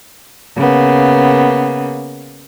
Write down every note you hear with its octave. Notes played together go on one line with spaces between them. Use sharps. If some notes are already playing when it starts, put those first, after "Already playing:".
C#3 A#3 B3